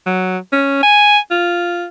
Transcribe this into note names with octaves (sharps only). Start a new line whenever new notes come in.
F#3
C#4
G#5
F4